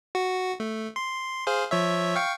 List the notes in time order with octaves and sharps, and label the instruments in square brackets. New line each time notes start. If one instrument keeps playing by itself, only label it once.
[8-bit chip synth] F#4
A3
C6
G#4 C5 F5
F3 C#5 E5
F5 G5 C#6